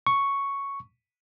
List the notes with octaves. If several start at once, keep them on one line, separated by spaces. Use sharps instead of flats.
C#6